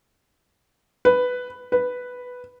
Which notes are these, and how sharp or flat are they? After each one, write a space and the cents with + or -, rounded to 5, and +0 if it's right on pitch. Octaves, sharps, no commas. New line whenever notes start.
B4 +5
B4 +0